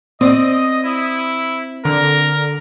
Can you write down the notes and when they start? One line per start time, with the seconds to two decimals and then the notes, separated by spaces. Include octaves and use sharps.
0.21 C4 D5 D#5 D#6
0.84 E4
1.85 D3 A#4